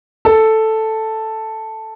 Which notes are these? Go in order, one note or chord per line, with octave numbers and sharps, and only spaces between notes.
A4